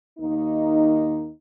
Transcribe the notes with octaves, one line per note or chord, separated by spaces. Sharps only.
D#2 D#3 A#3 D#4